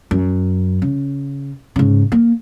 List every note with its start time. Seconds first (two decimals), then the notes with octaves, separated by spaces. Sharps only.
0.11 F#2
0.82 C#3
1.76 G#2 C#3
2.12 A#3